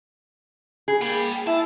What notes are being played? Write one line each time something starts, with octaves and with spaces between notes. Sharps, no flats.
G#4
A#3 G5 B5
E4 A5